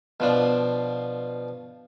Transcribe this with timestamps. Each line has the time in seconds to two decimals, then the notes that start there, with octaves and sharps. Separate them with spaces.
0.20 B2 F3 D4